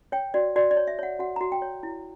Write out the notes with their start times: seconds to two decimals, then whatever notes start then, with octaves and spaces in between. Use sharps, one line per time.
0.12 C#5 G5
0.34 F#4 D5
0.56 F#4 D5
0.71 D5
0.77 C#5
0.87 E5
0.99 C#5 F#5
1.19 F#4 F#5
1.36 F#4 A#5
1.52 G5
1.62 C#5
1.83 E4